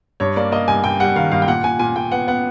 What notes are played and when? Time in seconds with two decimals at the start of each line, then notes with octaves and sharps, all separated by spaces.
0.20 G2 C#5
0.36 A#3 D5
0.52 A#3 D#5
0.68 G2 G#5
0.84 G2 G5
1.00 G3 F#5
1.16 D#3 F5
1.31 G2 F5
1.42 G5
1.48 A#2 F#5
1.64 A#2 G#5
1.79 A#2 G#5
1.96 A#2 G5
2.12 B3 F#5
2.28 B3 F#5